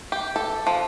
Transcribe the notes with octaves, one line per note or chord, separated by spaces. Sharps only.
G4
A4
F3